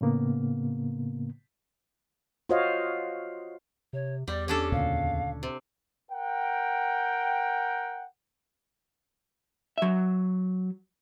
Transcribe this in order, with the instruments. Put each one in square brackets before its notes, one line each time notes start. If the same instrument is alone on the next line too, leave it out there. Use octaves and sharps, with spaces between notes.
[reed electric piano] A2 C#3 A#3 B3
[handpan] F4 F#4 C5 C#5 D#5 F5
[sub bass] C3 [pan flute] C#5
[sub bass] E2 [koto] G3 [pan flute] D5
[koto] C#4 D4 A4 [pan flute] G4
[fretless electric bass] D2 A#2 C#3 [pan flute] F5
[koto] C3
[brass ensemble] A#4 F#5 G5
[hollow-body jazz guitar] F#3 E5